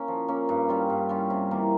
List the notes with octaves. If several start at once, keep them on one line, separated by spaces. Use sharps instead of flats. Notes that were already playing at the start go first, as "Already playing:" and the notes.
Already playing: A#3 C#4
F3
A#3 C#4
G2
G3 C#4 F4
G2
G3 C#4 F4
C3
E3 A#3